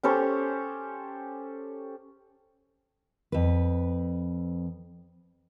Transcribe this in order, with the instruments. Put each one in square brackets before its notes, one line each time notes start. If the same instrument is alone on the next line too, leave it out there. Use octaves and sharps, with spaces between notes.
[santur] C#4 G4 A4 C5
[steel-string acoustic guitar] F2 B4